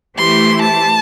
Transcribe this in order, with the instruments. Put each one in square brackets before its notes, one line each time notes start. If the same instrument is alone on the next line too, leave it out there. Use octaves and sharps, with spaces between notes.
[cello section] E3 A3 E4 G4 C5 [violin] C6
[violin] A5